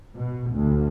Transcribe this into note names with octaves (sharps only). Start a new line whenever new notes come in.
B2
D2